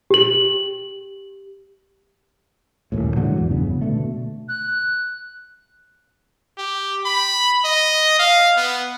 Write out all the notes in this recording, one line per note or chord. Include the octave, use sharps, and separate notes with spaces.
G4 F#7
D#1 G#1 D#2 A2
G#2 D3 E3 F#3
E2
E1 G2 C#3 B3
B2 D3 A3
F#6
G4
B5
D#5
F5
B3